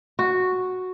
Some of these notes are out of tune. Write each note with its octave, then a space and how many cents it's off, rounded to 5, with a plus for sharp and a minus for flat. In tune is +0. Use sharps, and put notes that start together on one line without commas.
F#4 -5